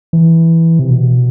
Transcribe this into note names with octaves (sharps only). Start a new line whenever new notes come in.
E3
C3
B2